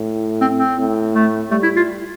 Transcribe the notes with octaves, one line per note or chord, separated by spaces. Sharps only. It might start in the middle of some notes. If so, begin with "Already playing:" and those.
Already playing: A2
C4
C4
A2
A3
G3 A3
E4
F4